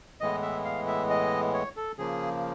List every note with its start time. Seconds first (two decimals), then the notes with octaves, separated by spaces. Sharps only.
0.20 A2 E3 G#3 B3 D#5
0.42 E5
0.65 F5
0.87 E5
1.10 D#5
1.54 C#5
1.76 A4
1.98 C#3 F3 A#3 G#4